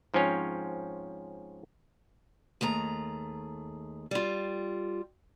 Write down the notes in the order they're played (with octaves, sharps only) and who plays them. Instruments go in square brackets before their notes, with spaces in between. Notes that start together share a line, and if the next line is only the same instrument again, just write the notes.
[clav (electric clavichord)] G#2 F3 C4 C#4 C#5
[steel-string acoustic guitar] D#2 A3 G#4 A#5
G3 F4